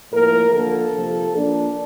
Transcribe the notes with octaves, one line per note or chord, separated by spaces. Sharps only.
A2 F3 A#3 A#4
D3 F3 A#3 A4
C3 F3 A#3
A#2 F3 A#3 D4